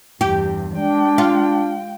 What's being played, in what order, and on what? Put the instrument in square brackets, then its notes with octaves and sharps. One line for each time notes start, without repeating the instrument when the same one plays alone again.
[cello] E2 G2 [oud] G4
[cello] G#3 G5 [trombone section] D4
[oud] F4